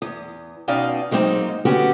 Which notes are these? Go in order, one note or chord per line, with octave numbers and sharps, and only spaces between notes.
E2
B2 C#4 D#4 D5 F5 G5
F#3 G#3 A#3 C4 D#4
D3 B3 C#4 F#4 G4